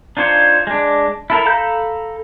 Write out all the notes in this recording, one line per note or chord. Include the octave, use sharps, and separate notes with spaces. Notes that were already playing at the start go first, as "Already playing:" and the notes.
D4 D#4 F4 C5 C#5
G#3 D4
E4 A4 A#4
A4 F5 A#5 B5 G6